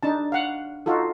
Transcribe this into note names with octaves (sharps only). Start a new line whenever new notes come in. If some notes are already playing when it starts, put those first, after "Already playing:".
D4 D#4 A5
F5 F#5
D#4 F4 F#4 A4